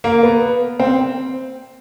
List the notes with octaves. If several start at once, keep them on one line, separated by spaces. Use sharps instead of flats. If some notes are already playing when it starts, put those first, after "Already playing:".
A#3
B3
C4